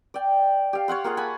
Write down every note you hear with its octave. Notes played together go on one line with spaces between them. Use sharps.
D5 G5
G4 F5
C#5 F5 F#5 C6
A#3 F4 G#4 F#5
F#5 G#5 A5 B5